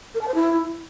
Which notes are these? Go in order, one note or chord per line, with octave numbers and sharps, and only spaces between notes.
A#4
A5
C5
E4